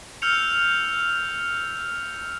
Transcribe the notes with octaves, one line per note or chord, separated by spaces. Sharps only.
E6 F6 G6 C#7 F7